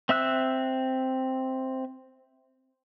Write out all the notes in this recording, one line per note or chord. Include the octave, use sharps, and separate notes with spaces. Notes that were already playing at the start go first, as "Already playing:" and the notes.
C4 E5 E6 F#6